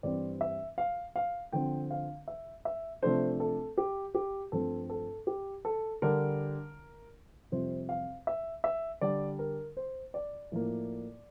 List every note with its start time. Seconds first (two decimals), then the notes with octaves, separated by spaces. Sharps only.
0.03 G2 E3 G3 C4 D5
0.41 E5
0.78 F5
1.16 F5
1.52 D3 F3 C4 G5
1.91 F5
2.28 E5
2.65 E5
3.02 C3 F3 A3 D4 C5
3.40 A4
3.78 G4
4.15 G4
4.52 G2 F3 A3 C4 A4
4.90 A4
5.27 G4
5.65 A4
6.02 D3 G3 D4 A#4
7.52 F2 C3 G3 C5
7.89 F5
8.27 E5
8.64 E5
9.01 D3 G3 D4 D5
9.39 A#4
9.77 C5
10.14 D5
10.52 A2 F3 A#3